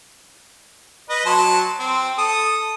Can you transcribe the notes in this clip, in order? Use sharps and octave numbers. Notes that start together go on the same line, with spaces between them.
B4 D#5
F#3 A5 C6
C4
A4 D#6